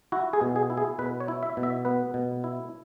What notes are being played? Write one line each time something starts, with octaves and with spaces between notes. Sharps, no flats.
E4 F#4
G#4
B2
G#4
E4
G#4
B2 B4
C#5
E4
E5
B2
E5
B3 B4
B2
E4